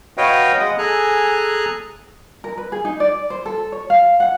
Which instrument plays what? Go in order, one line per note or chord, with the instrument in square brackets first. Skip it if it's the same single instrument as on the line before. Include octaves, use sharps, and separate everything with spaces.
[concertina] F#4 B4 C#5 D#5 F5 G5
G#3 D#5 F#5 D#6
G#4 A4 G#5 A#5 F#6
[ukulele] A#4
B4
G#4
D#4
D5
C5
A4
C#5
F5
F#5